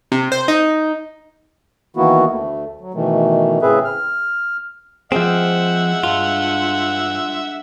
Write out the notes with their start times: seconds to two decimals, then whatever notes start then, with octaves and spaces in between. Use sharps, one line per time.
0.12 C3
0.32 C5
0.48 D#4
1.97 D#3 E3 A#3 B3 E4 F#4
2.31 D2 A3
2.81 F#3
2.94 B2 D#3 E3 A3
3.62 A2 C#3 C4 G#4 B4 E5
3.84 F6
5.12 F3 G#3 C4 E5 F#5 E6
6.04 G2 F4